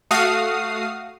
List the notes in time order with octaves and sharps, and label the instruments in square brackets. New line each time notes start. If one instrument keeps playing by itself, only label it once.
[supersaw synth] A3 F#4 F5 D#6 C7